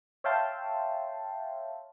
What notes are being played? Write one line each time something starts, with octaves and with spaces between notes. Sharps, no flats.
C#5 E5 F5 G5 A5 C6